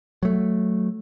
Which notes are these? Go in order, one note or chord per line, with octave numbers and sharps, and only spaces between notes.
F#3 A3